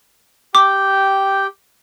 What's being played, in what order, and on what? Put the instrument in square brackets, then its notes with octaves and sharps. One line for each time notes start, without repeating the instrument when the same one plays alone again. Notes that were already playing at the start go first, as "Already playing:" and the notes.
[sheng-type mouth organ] G4 G5 [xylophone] D6